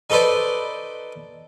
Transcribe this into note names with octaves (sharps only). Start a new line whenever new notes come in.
D#4 A4 B4 C5 D5